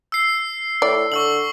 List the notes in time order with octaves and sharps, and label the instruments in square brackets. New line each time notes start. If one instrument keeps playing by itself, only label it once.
[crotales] E6 C7
[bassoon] A2 [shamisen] D5
[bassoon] D3 [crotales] C#6 E6 F#7